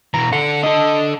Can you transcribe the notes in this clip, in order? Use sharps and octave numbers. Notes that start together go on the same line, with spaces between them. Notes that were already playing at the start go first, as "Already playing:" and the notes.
B2 E3 A#5
D3 A4 F#5
D3 A4 D#5